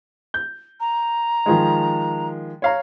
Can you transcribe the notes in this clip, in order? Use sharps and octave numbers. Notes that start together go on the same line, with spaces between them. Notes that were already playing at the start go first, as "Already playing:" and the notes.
G6
A#5
D#3 F3 G#3
C#5 F5 A#5